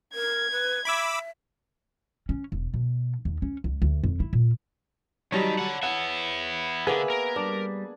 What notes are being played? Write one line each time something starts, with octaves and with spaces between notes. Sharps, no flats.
A#4 G#6
B4
E5 B5 D6 E6
C#4
E1
B2
D#2
C#4
C#2
D2
F2
E4
A#2
D#3 F#3 G3 D#4 C#5 A5 B5
D5 F#5
B3 E4 F#5
D3 A#3 B3 G#4 B4 E5 G#5
A#4
G3 D4